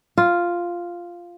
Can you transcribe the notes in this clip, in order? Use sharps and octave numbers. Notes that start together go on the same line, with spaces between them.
F4